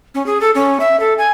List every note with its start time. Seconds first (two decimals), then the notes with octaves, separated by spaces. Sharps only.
0.14 C#4
0.26 G#4
0.40 A4
0.55 C#4
0.80 E5
0.99 A4
1.18 G#5